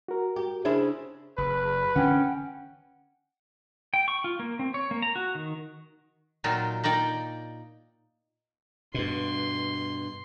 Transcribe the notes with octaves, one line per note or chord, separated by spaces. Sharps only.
F#4 A#4
G4
C#3 D4 E4 G#4 C5
F#1 B4
D3 E3 C4 C#4 F#5 G5
G5
C#6
F4
A#3
C4
C#5
A#3
A#5
F#4
D#3
A#2 F#3 D#4 F4 G5
A#3 D#4 D5 G5
G2 B2 C6